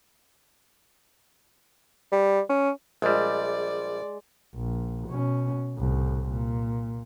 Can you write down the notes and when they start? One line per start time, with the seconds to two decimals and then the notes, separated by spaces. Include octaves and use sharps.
2.12 G3
2.49 C#4
3.02 A#1 G3 G#3 D5
4.55 A#1
5.08 B2 C#4
5.76 C2 A2
6.29 A#2